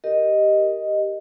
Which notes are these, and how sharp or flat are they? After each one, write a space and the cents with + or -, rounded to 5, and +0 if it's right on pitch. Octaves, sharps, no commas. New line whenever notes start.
G4 +0 A#4 +0 D#5 +0